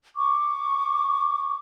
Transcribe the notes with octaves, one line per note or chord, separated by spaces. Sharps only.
C#6 D6